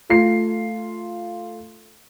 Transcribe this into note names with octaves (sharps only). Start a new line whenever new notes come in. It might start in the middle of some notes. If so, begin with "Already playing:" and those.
A3 F4 C7